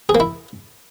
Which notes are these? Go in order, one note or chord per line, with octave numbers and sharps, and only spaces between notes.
G#4
A#3
E4